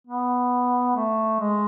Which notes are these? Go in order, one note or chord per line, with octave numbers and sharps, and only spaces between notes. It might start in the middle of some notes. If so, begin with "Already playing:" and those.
B3
A3
G#3